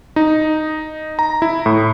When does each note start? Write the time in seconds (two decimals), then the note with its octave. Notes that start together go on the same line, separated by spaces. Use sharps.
0.16 D#4
1.19 A#5
1.42 E4
1.66 A2